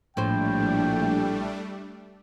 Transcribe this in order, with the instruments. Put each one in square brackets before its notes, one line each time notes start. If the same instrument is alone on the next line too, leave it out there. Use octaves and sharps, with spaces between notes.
[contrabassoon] A#1 [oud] A2 C5 [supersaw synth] G3 A3 D4 [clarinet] G5